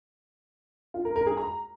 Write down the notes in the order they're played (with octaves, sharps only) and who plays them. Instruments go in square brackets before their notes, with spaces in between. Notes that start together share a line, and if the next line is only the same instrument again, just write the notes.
[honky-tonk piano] F4
A#4
A#4
G#4
A#5